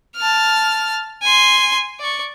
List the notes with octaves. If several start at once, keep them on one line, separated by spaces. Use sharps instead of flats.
A5 F6
G#5 C6
D5 C#6